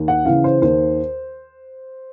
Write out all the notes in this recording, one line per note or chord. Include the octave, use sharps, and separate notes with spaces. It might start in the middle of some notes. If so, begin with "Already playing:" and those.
Already playing: D#2
F#5
C#3 E3 F5
C5
D#2 C5